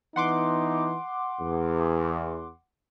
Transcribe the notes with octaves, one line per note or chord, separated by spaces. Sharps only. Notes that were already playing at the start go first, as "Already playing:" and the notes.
E3 B3 D#4 F#5 C6 D6
E2